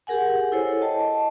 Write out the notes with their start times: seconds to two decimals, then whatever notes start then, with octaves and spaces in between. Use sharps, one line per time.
0.07 G4 G#4 A#4 F#5 G#5
0.52 E4 A4 C5 C#5
0.81 D#5 G5 A5